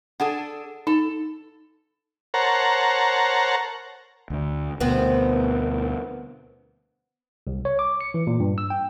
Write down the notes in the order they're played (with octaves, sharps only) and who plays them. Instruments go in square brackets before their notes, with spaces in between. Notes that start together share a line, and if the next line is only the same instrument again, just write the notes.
[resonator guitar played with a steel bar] D4 G#4 A4 [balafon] F#5
[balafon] D#4 [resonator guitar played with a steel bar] A4
[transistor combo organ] A#4 C5 C#5 F#5 A5 A#5
[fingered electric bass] D2 D3
[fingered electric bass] D2 B2 [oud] B3 C4 [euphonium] A#4
[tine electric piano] C2
C#5
D6
C#7
E3
A#2
G2
E6
G5